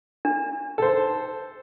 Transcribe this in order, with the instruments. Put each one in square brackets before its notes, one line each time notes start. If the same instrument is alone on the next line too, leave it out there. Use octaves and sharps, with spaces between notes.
[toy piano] D4
[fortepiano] A4 C5